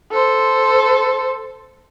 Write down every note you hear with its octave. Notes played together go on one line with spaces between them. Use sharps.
A4 C5